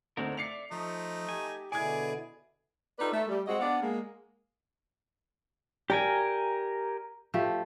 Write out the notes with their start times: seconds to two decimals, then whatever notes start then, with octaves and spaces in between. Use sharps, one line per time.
0.17 D2 C4 D4 D#4 A#4
0.37 D5 E5 D6 C7 C#7 F7
0.71 F3 A3 D#4
1.29 G4 G#5
1.72 B2 D3 E4 G#4 D5 G#5 G#6
2.99 D#4 F4 A4 B4 D5
3.13 A3
3.28 G3
3.47 G#3 C4 F#4 D#5 F#5
3.60 B3 D4 D5 F5 F#5
3.81 G#3 A#3
5.90 G4 A#4 D5 G5 G#5
7.34 F3 A3 G4